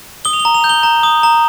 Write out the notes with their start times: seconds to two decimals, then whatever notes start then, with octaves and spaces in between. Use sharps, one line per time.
0.25 D#6 G7
0.33 F7
0.40 G7
0.45 A#5
0.54 F7
0.64 G6
0.69 G7
0.83 A#5
1.03 D#6
1.23 A#5